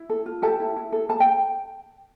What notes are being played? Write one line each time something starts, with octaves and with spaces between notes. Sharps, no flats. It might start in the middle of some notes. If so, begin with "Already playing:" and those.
Already playing: E4
A4
F4
G4 A4 A5
E4
E4
A4
A4 A5
G5